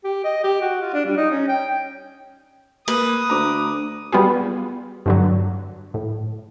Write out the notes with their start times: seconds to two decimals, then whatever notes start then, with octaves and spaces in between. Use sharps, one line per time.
0.04 G4
0.24 D#5
0.44 G4
0.61 F#4
0.81 F4
0.93 D4
1.05 G3
1.17 D#4
1.31 C#4
1.48 G5
2.88 A#3 B4 D#6
3.30 D2 A#5 D6
4.12 G3 B3 F4 F#4 G#4
5.06 G2 D3 F#3
5.94 A2